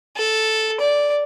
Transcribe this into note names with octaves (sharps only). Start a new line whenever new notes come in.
A4
D5